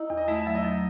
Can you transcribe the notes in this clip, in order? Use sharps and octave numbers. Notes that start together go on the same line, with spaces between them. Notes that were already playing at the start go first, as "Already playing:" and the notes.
Already playing: D#4 E4
E2
D#5
A3 E4 E5
F#3 E5
D#4 D#5
F#3